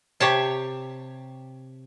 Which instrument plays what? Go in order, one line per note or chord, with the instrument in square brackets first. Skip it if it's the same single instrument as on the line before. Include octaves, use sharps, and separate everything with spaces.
[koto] C3 G4 C#5 A5